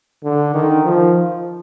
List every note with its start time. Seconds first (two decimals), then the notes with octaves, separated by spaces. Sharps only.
0.24 D3
0.54 D#3
0.84 F3